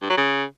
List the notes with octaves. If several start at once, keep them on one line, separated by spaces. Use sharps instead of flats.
G2
F#3
C#3